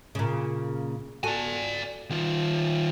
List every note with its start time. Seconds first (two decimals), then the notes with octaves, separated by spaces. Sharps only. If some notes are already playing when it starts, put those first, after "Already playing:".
0.15 A#2 C#3
1.24 F#4 A4 D5 G#5
2.10 D#3 F4